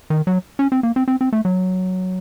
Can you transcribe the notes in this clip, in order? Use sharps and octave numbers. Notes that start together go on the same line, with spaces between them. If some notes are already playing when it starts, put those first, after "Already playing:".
D#3
F#3
C#4
C4
A#3
C4
C4
C4
A3
F#3